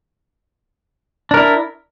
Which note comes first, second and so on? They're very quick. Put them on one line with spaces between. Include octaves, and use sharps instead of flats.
D4 A#4 E4